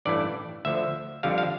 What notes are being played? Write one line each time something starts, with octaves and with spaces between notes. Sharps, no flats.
A1 G2 E3 A3 E4 D5
D2 D3 F3 E5
F2 D3 G3 F5
F5